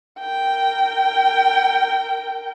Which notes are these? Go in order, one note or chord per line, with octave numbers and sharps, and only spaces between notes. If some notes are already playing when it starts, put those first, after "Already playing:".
A#4 G5